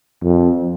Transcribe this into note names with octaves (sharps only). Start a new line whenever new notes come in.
F2